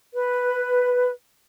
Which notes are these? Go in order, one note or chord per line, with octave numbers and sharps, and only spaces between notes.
B4